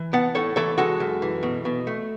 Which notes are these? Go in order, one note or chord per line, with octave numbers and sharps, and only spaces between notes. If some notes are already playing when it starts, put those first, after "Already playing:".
Already playing: E3
B3 F#5 A5
A2 A4 C#5
E3 A4 C#5
G#3 F#4 A4
F#2
E3
B2
B2
A3